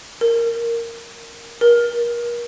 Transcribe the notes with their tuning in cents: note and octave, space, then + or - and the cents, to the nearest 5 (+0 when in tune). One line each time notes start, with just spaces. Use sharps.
A#4 -5
A#4 +35